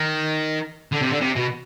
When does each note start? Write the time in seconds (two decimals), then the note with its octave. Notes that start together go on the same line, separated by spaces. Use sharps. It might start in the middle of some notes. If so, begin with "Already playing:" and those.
Already playing: D#3
0.92 D3
1.02 C3
1.10 D3
1.21 C3
1.36 B2